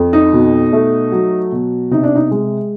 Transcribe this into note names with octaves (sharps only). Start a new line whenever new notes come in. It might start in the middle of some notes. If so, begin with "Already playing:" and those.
Already playing: F2
D#4
B2
A3
F#3
B2
C3 D#4
D4
D#4
G#3